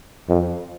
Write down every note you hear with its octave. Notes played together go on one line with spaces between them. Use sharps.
F2